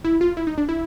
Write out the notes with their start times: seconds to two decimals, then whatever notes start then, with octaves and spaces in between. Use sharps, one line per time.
0.05 E4
0.21 F4
0.37 E4
0.47 D#4
0.58 D4
0.69 E4